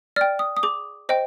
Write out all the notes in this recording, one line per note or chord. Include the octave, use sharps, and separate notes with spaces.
D5 G5 F6
D#6
D#6
G#4 D6
C5 D#5 G5